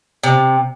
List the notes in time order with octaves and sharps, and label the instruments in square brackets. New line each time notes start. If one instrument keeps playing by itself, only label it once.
[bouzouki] C3